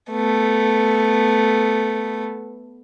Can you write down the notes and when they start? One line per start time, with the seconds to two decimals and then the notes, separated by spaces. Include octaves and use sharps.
0.11 A3 B3